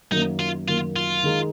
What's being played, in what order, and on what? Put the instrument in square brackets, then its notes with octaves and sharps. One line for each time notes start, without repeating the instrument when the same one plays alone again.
[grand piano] F#2 D#3 A#3 [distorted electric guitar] D#4
[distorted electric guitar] F4
[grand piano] F#2 D#3 A#3 [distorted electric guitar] F4
[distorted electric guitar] F4
[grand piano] D#3 G#3 D#4